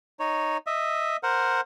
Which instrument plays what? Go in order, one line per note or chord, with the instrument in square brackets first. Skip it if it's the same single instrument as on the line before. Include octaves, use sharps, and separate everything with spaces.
[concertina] D#4 C#5
D#5 E5
A#4 C5 F#5